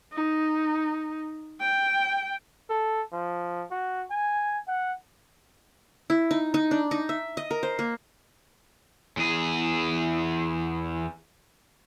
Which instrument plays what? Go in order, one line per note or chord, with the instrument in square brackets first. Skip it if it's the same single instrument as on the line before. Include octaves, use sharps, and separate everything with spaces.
[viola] D#4
G5
[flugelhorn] A4
F3
F#4
G#5
F#5
[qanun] E4
D#4
D#4
D4
D#4
E5
D#5
A#4
C5
A#3
[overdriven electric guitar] E2 G#4